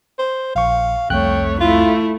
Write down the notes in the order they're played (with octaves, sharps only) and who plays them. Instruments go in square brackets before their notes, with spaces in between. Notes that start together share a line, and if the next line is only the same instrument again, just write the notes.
[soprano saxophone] C5
[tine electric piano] A#1 C#6 [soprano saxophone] F5
[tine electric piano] C2 F2 F#6 [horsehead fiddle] A3 C#5 [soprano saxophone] G5
[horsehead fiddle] A3 E4 [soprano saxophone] F4